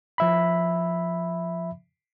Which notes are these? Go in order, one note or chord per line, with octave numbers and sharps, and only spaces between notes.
F3 E5 B5